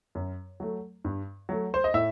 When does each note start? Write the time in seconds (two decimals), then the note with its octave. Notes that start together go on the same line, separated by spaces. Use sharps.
0.15 F#2
0.60 F#3 A3
1.04 G2
1.49 F#3 A3
1.74 C5
1.84 D#5
1.94 A2 E5